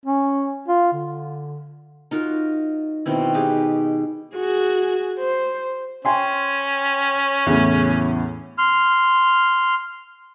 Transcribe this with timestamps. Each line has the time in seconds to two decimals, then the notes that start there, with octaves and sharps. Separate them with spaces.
0.05 C#4
0.68 F4
0.93 D3
2.11 D#4 F4 F#4 A#4
3.06 B2 D#3 C4 E4
3.34 D#4 G4 G#4 B4
4.36 F#4 G#4
5.18 C5
6.05 C#4 G5 G#5 C6
7.46 E2 A2 C#3
8.58 C6 F6